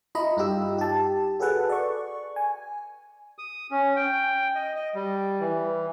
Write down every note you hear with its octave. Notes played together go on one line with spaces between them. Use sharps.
E4 F4 D#5 A#5 B5
G2 D#4 F4 G4 E6
G4 A5
F#4 G#4 A4 B4 F#5
D5 C#6
G#5
D#6
C#4
G5
D#5
D#5
G3
E3